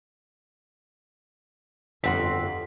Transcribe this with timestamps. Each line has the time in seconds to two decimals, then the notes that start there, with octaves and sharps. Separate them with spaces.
2.04 G1 F2 C4 F#4 C6 B6